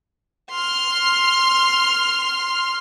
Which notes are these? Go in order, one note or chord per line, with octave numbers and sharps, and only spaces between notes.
C6 F6